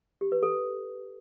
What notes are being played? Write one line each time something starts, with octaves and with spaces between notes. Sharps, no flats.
G4
B4
A4